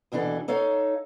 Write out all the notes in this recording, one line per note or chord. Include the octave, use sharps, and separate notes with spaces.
D#2 B2 E3 D4 A4
D#4 A4 C#5 F5